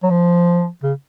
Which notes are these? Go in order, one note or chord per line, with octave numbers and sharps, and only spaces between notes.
F#3
F3
C#3